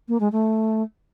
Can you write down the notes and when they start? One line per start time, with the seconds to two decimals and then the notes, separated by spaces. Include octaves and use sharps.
0.08 A#3
0.20 G#3
0.32 A3